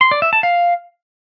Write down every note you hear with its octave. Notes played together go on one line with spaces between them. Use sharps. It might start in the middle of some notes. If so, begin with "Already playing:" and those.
C6
D5
E5
A5
F5